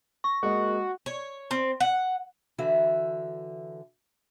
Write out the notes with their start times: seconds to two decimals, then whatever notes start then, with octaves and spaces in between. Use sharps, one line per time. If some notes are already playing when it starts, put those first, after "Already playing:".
0.24 C#6 A#6
0.43 G#3 A#3 F#4 D#5
1.06 C#5
1.51 C4
1.80 F#5
2.58 D3 E3 F#4 E5